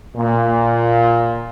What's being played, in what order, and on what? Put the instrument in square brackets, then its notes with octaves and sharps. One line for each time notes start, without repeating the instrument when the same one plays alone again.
[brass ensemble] A#2